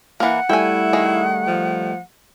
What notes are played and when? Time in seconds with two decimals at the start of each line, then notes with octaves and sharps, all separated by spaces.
0.20 E3 A#3 F#5
0.49 G3 A3 E4 G5 G#5
0.93 D#3 G#4
1.47 F3